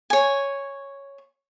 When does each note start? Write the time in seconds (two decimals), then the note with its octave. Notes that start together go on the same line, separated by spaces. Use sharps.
0.10 C#5 G#5